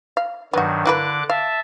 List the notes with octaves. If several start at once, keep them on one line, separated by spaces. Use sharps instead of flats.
F5
G2 D#3 F#3 B3 F#4
D3 E3 A#3 B4 D6 F#6
E5 F5 A5